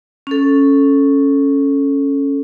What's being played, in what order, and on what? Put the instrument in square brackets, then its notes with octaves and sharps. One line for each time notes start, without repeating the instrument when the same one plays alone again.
[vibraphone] C#4 A4